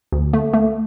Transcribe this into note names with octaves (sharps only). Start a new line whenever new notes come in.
D2
A3
A3